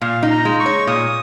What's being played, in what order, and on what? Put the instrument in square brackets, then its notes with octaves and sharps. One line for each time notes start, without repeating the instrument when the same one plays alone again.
[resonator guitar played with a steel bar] A#2 [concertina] F5
[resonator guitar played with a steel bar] D#4
[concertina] A#5
[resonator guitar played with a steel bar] G#3
[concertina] C#6
[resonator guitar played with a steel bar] C#5
[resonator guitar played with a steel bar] A#2 [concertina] D#6